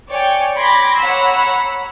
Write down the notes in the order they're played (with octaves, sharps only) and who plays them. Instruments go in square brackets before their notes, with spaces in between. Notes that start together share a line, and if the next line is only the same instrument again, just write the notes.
[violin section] C#5 D5 G5 G#5
B5 C6 D6 G#6 A#6
C#5 F#5 A#5 B5 E6